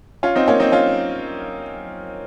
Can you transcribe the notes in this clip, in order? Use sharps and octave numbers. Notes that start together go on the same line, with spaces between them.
C#4 F4
C4 D#4
A#3 C#4
C4 D#4
C#4 F4